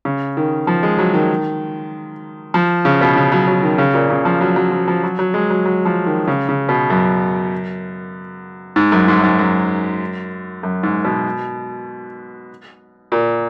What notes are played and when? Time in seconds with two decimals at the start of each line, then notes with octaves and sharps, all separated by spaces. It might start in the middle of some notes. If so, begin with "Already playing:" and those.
0.05 C#3
0.37 D#3
0.67 F3
0.83 G#3
0.99 F#3
1.14 D#3
2.54 F3
2.85 C#3
3.01 B2
3.16 C#3
3.32 F#3
3.47 F#3
3.63 D#3
3.78 C#3
3.94 A#2
4.10 C#3
4.25 F3
4.41 F#3
4.56 F#3
4.72 F3
4.88 F3
5.04 F#3
5.19 F#3
5.34 G#3
5.50 F#3
5.65 F#3
5.85 F3
6.06 D#3
6.28 C#3
6.49 C#3
6.69 B2
6.90 F#2
8.76 G#2
8.92 F#2
9.08 G#2
9.19 F#2
9.23 G#2
9.39 F#2
10.63 F#2
10.83 G#2
11.05 B2
13.12 A#2